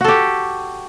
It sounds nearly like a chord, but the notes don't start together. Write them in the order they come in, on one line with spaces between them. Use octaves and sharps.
F#4 A4 G4